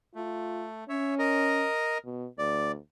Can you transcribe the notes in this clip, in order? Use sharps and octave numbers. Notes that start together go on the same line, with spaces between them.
A3 F4
C#4 C#5 E5
A#4 D#5
B2
D2 D5